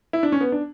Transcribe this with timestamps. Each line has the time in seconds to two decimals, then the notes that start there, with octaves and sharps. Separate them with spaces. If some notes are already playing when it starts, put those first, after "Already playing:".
0.13 E4
0.23 D4
0.32 C#4
0.41 B3
0.52 D4